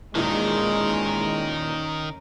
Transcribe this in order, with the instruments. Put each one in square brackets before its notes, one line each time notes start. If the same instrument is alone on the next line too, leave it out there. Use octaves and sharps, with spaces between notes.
[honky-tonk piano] D#2 A#2 E3 [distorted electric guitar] D#3 [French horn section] G#3 [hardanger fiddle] C#4 A#4